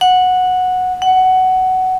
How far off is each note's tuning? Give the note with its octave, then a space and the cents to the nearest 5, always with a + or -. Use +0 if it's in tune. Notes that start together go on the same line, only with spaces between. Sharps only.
F#5 -10
F#5 +15